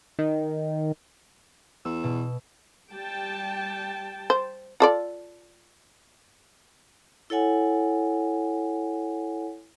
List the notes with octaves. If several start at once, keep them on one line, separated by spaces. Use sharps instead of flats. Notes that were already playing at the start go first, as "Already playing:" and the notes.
D#3
E2 E6
B2
G3 G5 A5
C5
F4 A4 D5
E4 A4 C#5 F#5 G#5